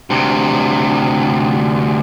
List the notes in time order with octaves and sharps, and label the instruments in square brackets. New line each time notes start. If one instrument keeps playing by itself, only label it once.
[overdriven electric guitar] D2 C3